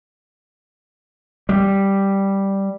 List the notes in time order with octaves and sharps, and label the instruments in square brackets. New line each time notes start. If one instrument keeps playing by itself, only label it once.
[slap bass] G3